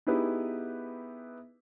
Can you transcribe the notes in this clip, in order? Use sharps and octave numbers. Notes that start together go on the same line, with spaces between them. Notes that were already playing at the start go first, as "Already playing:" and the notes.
B3 D#4 E4 G4 G#4 B4